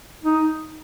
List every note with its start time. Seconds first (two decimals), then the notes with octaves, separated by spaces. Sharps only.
0.24 D#4